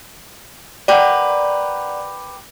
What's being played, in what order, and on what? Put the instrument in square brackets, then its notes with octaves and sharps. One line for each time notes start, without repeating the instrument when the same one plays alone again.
[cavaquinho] G4 A#4 B4 [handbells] D5 F#5